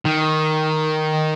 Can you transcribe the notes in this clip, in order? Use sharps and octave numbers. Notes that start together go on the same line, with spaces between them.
D#3